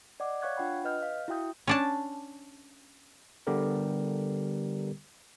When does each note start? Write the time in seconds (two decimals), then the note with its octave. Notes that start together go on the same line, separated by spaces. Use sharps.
0.20 D5 D#5 F#5 D6
0.42 C#5 F5 C#6 F#6 G#6
0.57 D4 F4 F#5 G5 B5
0.84 B4 D#5 F6 G6
1.03 F5
1.28 E4 F#4 E5 G5 D#6 G6
1.67 C#4 D4 A5
3.47 D3 G3 B3 G4 A4 A#4